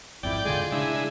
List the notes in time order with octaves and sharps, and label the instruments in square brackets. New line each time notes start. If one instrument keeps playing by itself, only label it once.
[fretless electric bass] G#1 F2 G#2 [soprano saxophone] E4 [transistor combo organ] D5 G5
[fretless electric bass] A#2 D3 G#3 [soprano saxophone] F4 [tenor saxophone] G#4
[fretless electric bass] C#3 [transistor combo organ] G#3 E4 [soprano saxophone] D4